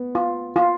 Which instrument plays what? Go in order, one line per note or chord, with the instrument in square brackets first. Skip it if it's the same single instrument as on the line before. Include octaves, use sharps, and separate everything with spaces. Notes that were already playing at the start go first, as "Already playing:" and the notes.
Already playing: [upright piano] B3
[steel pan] F4
F4